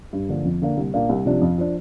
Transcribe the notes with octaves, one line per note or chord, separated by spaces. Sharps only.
G2
D3 F3 A#3 D4
F2
D3 A#3 D4
C2
A#2 A#3 D4
C2
C3 F3 D4
F2
F3 D4